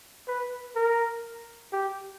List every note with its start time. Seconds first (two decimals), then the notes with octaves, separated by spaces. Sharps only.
0.28 B4
0.76 A#4
1.72 G4